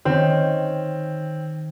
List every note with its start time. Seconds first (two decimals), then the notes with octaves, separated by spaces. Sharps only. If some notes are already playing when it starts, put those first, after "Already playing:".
0.05 D#3 C4 C#4